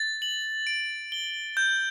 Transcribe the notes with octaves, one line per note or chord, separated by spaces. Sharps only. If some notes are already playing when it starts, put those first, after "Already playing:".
Already playing: A6
F#7
D7
G7
G6